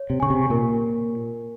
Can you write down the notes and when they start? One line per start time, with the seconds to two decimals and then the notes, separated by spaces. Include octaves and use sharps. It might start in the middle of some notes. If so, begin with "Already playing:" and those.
Already playing: C#5
0.10 C3
0.20 C#3 G#5 C#6
0.30 C3
0.50 A#2 A#4